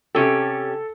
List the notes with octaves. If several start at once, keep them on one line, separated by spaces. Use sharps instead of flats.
C3 C#4 G4 A4